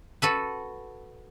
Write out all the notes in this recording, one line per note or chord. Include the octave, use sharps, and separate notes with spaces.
F#4 A4 B4